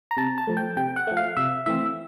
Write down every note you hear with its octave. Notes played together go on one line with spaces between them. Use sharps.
A#5
C3 A5
A5
F3 A3
G5
C3 G5
F#5
F3 A3
F5
C3 E5
E3 A3 C4 E5